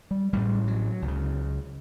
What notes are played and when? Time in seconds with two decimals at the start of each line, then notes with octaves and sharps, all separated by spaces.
0.11 G3
0.33 A1 A2 G3
0.68 F#3
1.02 C#2
1.08 C#3